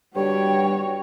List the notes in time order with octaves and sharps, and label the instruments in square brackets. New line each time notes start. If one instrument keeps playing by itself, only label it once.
[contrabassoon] G2 [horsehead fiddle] F#4 C#5 [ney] G5